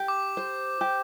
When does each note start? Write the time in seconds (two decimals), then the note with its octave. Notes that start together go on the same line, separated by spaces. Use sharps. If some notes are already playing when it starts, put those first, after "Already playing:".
Already playing: G4
0.08 D6
0.37 C5
0.81 G4